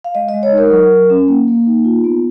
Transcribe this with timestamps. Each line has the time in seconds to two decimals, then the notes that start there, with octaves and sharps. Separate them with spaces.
0.04 F5
0.15 G#3 D#5
0.28 D#5
0.34 G#3
0.43 C#5
0.52 D#4
0.58 A#4
0.71 F#3
0.90 F#3
1.10 C#4
1.28 A#3
1.48 A#3
1.66 D#4
1.85 F4
2.04 B3